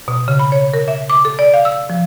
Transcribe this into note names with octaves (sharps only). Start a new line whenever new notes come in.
B2
C#3
B5
C#5
A#4
E5
D6
A4
D5
F5
E6
F3